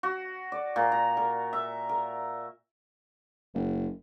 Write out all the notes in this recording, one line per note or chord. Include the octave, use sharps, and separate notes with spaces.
F#4
D5
A#2
A#5
A#4
E5
A#4
F#1